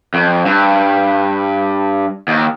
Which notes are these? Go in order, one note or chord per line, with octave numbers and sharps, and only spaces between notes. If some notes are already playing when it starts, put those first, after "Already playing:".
F2
G2
D#2